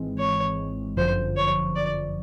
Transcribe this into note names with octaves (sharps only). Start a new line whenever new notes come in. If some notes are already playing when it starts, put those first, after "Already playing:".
Already playing: G#1 G#2 E3 G#3 C4
C#5
G1 F#2 D3 F3 C5
C#5
D5